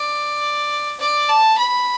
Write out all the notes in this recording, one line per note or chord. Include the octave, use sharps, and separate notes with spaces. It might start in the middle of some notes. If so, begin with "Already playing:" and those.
Already playing: D5
D5
A5
B5